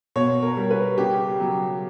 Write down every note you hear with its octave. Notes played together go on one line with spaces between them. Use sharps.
B2 C#5
A#4
G3
B4
C#3 G4
F#3